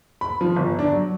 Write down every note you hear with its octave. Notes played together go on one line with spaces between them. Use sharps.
B5
F3
G1
D4
F#3